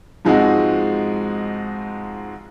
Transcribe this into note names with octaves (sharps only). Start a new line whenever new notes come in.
G#2 F3 G#3 C4 D#4 F#4